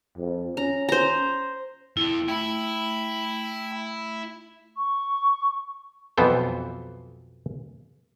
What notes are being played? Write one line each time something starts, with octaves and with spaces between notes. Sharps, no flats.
F2
C#4 A#5
C5 A#5
F2 C4 E4
A3 E4 G5 B5
C#6
B1 F2 E3 B3 A4 C5